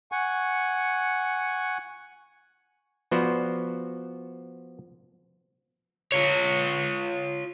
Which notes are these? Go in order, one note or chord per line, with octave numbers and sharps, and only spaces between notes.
F#5 G#5 C#6
F3 B3 F#4 C5 D5
F4 C#5